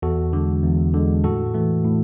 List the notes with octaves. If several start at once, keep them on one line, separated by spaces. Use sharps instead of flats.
E2 F#4 A4
D3 G#3
E2
D3 G#3
A2 F#4 A4
E3 A3
A2